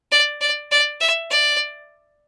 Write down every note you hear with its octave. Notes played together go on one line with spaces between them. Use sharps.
D5
D5
D5
E5
D5